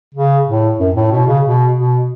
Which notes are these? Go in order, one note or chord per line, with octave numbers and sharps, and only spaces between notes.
C#3
A2
F#2
A2
B2
C#3
B2
B2